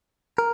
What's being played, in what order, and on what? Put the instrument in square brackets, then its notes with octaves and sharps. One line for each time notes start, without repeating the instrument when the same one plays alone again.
[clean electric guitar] A#4